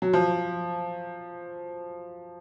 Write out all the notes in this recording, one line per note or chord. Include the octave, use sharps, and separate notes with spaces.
F#3
F3